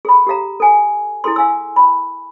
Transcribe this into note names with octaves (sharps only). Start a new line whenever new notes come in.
G#4 A4 B5
G4 A4 F5 A#5
A4 G#5
E4 G#4 A4 C6
F5 G#5 E6
B5